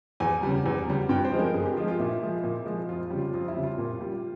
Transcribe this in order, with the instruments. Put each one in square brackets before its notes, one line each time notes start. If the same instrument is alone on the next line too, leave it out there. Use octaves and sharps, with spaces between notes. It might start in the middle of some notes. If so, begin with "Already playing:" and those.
[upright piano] E2 G#5
C#3 G3
E2
C#3 G3
G2 G5
C5
F3 G#3
A#4
G2 G#4
G4
F3 G#3 F4
F4
A#2 E4
F3 G#3
A#2
F3 G#3
F2 F4
C#3 G3
F4
F2 F4
E4
C#3 G3
F4
A#2
G3